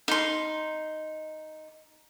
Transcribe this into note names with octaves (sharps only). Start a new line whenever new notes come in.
D#4 C6